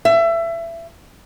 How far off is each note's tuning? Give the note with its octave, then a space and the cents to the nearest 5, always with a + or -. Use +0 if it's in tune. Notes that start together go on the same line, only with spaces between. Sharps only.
E5 +25